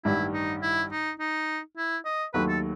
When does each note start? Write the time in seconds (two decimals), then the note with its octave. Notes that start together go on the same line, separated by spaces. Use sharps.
0.04 A1 G2 D#3 G3 E4
0.33 D#4
0.63 E4
0.91 D#4
1.19 D#4
1.77 E4
2.05 D#5
2.33 D#2 D#3 F#3 A3 B4
2.49 A4